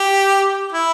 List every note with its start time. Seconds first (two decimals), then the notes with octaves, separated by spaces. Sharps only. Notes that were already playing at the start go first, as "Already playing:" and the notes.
Already playing: G4
0.72 E4